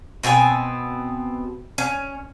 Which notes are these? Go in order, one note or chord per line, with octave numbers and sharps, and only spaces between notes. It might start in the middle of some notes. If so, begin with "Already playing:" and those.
B2 B3 C4 G#5
C#4